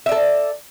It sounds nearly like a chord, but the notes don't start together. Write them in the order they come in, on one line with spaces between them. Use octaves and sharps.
E5 D5 A4